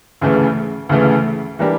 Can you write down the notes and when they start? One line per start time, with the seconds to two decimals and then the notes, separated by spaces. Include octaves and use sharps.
0.21 D2 C#3 E3 A3
0.89 D2 C#3 E3 A3
1.59 E3 G3 A#3 D4 G4